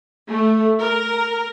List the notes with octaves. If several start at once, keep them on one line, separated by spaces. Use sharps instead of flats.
A3
A#4